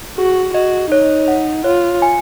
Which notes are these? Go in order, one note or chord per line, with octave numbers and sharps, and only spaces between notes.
F#4 G#4
F#4 D#5
D#4 C#5
F#5
F4 C#5
G#5